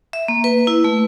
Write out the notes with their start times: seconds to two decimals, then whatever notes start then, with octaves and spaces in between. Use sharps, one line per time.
0.13 E5
0.28 A#3
0.44 B4
0.67 E4
0.84 A3